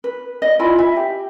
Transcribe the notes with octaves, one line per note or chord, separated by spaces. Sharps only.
B4
D5 D#5
E4 F4 G#5 B5
E5
G4